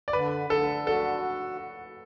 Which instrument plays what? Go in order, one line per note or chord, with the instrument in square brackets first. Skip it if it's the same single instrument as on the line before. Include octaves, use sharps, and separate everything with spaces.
[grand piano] D5
[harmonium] D3 [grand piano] B4
[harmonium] D3 [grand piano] A4
[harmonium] F#4 [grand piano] A4